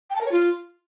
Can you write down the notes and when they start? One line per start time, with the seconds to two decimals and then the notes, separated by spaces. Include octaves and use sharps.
0.10 G5
0.15 A5
0.21 A#4
0.26 C#5
0.32 F4